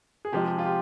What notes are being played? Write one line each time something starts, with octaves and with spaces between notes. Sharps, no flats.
G#4
C3 F3 G#3 G4
G4
F4
G4